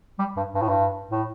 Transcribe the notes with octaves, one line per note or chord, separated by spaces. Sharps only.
G3
G2
G2
A2
G2
A2